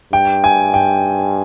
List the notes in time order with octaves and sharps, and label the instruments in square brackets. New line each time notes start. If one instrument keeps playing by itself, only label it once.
[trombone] G2 [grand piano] G5
[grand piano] G#5
G5